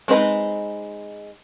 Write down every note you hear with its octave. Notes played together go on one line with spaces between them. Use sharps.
G#3 C4 D#4 B4